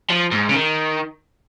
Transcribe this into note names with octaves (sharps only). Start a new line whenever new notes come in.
F3
G#2
C#3
D#3